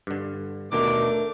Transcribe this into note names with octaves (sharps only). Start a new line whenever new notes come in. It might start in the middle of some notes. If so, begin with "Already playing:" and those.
G2 D3
D#2 B2 D3 A3 D4 A#4 D6